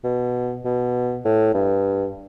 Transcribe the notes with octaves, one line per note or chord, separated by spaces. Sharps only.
B2
B2
A2
G2